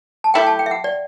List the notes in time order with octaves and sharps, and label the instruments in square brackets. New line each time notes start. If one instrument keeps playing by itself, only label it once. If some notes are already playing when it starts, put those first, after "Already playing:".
[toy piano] A5
[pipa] A3 E4 G4 [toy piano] G5
[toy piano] A5
G5
E5
F#5
D5